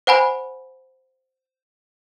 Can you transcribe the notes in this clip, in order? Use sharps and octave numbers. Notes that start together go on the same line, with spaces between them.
C5 F#5 G#5 B5